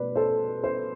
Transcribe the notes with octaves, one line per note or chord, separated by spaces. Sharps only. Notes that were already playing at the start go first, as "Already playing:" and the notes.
Already playing: B2 A3 B4 D5
A4 C5
A4 C5